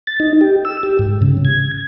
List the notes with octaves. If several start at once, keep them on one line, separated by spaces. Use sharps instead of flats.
A6
D#4
G4
E6
G4
G#2
C#3
G#6